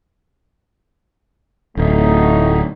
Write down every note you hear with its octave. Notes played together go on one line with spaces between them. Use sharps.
D1 A3 D#4